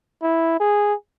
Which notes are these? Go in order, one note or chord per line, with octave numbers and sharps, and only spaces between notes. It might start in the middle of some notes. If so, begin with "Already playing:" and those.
E4
G#4